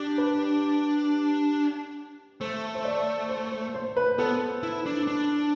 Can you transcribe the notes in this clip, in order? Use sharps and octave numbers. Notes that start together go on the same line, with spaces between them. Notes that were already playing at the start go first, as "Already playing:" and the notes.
Already playing: D4 G4
B4
A3 C5
C5
D5
C5
C5
C5
B4
B3 A4
E4
D4
D4